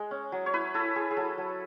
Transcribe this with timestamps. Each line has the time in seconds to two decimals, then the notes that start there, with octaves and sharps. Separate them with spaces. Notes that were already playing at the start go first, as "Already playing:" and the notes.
Already playing: G#3
0.11 C#4
0.32 F#3
0.46 C#5
0.53 E4 B4
0.74 E4 A4
0.96 E4 G#4
1.11 G#4
1.17 F#3 A4
1.38 F#3